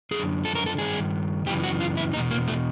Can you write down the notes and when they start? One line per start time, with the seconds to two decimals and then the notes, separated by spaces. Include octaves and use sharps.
0.11 F#2 D3 G#4
0.45 A4
0.55 A#4
0.66 A4
0.78 G2 D#3 G#4
1.46 F#2 C#3 E3 G4
1.63 F#4
1.80 F4
1.97 E4
2.13 E2 B2 D#4
2.31 A#3
2.48 A3